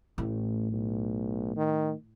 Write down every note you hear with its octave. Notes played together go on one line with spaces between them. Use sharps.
A1 A2
B1
D#3